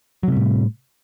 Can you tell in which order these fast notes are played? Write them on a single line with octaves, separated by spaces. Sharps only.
F#3 C3 G3 A2